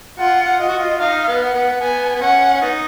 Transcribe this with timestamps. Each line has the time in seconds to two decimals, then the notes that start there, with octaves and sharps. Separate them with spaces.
0.19 F4 F#5
0.59 F4 D#5
0.69 F#4
0.78 F4
1.00 D#4 F5
1.28 B3
1.41 F#5
1.54 B3
1.81 B3 G#5
2.15 B3
2.21 C#4 F#5
2.54 C#4
2.62 B3 D#4